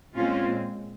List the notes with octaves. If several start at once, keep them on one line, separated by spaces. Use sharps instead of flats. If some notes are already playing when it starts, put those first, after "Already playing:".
A#2 G#3 C4 C#4 F4